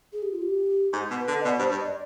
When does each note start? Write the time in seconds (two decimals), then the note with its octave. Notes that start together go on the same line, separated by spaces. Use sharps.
0.13 G#4
0.22 G4
0.32 F4
0.42 G4
0.93 G#2
1.10 B2
1.19 B4
1.28 D3
1.41 D#5
1.45 B2 D5
1.59 G2 C5
1.71 G2
1.80 D#5
1.85 D5